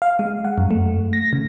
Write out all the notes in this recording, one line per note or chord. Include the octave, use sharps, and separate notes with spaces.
F5
G#3
F#5
F#2
A3
A#6
C#3